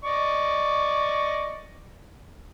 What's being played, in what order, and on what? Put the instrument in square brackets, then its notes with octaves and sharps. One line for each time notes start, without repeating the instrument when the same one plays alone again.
[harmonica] D5 D#5 C#6